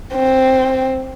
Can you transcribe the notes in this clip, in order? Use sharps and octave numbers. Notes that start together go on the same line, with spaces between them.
C4